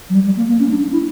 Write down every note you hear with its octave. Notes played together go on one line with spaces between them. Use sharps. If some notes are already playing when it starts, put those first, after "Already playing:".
F#3
G3
G3
A#3
A#3
C#4
D4
D4
E4